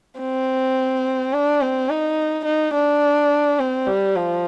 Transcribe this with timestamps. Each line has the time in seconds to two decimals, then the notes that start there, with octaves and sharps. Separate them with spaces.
0.20 C4
1.33 D4
1.61 C4
1.90 D#4
2.45 D#4
2.74 D4
3.59 C4
3.87 G3
4.16 F3